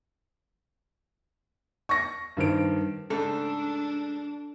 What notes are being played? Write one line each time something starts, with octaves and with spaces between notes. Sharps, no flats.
C#6 A#6
G2 D#3 C5 D7
G#2 C#3 A3 D4 A4